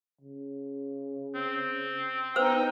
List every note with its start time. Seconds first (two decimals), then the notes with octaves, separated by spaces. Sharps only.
0.21 C#3
1.35 C4
2.36 B3 D#4 B4 C5 G5 E6